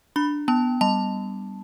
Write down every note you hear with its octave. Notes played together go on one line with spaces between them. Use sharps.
D4 B5
B3 A5
G3 A5